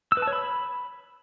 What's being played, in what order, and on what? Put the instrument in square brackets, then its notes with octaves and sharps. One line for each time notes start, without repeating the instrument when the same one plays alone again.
[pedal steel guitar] E6
B4
A5
C#5
B5